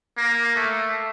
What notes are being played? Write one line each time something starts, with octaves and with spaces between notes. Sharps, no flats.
A#3
A3